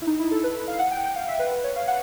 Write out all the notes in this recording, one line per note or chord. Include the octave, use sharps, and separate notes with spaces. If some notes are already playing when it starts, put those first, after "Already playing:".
E4
D#4
E4
A4
B4
B4
F5
F#5
G5
G5
F5
E5
B4
B4
C#5
F5
F#5